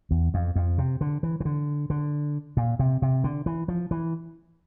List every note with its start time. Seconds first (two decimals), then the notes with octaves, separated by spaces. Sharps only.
0.11 E2
0.34 F2
0.56 F2
0.78 C3
1.01 D3
1.23 E3
1.40 E3
1.45 D3
1.90 D3
2.57 A#2
2.79 C3
3.02 C3
3.24 D3
3.46 E3
3.68 F3
3.91 E3